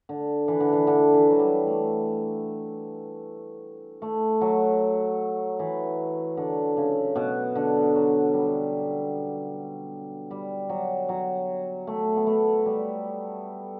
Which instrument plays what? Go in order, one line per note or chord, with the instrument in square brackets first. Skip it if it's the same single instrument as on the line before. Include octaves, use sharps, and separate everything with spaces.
[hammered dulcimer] D3
E3
D3
E3
D3
E3
F#3
G3
A3
A3
F#3
E3
D3
C#3
B2
D3
F#3
G3
G3
F#3
F#3
A3
B3
A3
G3